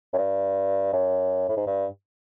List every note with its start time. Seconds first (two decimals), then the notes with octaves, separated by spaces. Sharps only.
0.13 F#2
0.18 G2
0.93 F#2
1.49 A2
1.57 G#2
1.67 G2